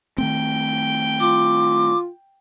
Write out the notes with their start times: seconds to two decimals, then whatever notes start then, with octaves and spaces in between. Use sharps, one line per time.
0.18 D#3 A3 C4 G5
1.20 F4 D6